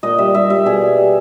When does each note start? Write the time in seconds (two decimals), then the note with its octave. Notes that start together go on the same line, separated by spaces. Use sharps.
0.03 A#2 D#5
0.18 G3 E5
0.34 G3 E5
0.50 G3 E5
0.65 B2 G#4
0.81 G3
0.97 G3